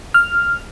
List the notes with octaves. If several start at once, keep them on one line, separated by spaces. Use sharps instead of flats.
F6